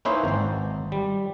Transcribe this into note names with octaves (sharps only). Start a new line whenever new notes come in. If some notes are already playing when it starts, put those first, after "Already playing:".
A#3 C#4 D#4 E4 B4 C5
G#1 C5
G3